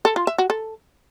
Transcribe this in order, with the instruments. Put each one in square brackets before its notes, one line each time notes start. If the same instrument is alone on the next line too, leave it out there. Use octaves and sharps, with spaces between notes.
[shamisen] A4
F4
E5
F#4
A4